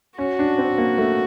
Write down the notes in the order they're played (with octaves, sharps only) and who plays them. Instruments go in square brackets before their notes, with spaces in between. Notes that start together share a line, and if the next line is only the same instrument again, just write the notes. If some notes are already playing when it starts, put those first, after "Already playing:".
[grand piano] C#4 [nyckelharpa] F#4
[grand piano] D4
C4
A#3
A3